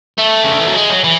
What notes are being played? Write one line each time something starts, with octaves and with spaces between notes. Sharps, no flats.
A3
C#3
D3
E3
F#3
G#3
F#3
E3